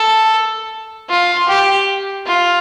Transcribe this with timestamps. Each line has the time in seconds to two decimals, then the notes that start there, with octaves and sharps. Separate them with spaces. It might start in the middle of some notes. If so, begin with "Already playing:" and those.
Already playing: A4
1.09 F4
1.48 G4
2.26 F4